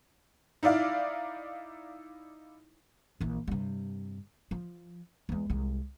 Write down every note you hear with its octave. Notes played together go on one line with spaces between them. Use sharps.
D#4 E4 D5 F5
A#1 E3
G2 C3
F3
E2 G#3
C2 G#3